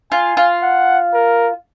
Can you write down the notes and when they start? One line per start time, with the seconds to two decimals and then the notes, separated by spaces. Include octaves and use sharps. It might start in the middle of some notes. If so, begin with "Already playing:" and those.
0.11 F4 G#5
0.37 F4
0.63 F#5
1.14 A#4